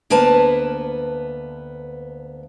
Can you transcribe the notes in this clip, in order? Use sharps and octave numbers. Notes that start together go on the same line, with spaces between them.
D2 A#3 B3 B4 A5